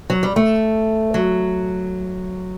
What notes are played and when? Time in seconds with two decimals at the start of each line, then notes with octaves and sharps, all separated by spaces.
0.10 F#3
0.23 G3
0.36 A3
1.14 F#3